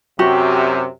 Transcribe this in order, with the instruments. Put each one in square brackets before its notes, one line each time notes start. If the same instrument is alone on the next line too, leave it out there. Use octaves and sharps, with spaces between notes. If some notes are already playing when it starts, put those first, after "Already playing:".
[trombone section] F#2 C3 [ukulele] F#4 G4